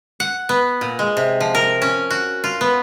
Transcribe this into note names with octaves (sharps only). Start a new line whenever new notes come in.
F#5
B3
A#2
G#3
C3
F3
A#4
C#4
F#4
F4
B3